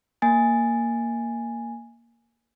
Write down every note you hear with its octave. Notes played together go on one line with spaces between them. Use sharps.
A#3 G#5 A6